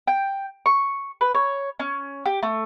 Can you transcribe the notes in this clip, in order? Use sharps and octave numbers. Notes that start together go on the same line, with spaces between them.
G5
C#6
B4
C#5
C#4
G4
A3